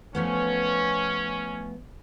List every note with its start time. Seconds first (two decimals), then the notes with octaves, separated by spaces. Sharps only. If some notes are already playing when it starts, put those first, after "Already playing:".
0.15 F3 A3 B3 C#4